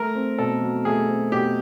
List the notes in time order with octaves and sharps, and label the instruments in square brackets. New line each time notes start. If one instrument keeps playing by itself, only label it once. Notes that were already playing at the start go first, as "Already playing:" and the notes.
Already playing: [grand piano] A3 [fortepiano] A#4
[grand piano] C4
[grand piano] B2 [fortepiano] A4
[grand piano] F#3
[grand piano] A3 [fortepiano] G#4
[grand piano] C4
[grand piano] B2 [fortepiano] G4